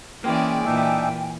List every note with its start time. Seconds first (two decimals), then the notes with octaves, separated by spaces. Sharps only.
0.24 E3 G#3 A#3 C#4 G#4 D5 G5 G#5
0.65 A#2 E3 D4 D#4 E5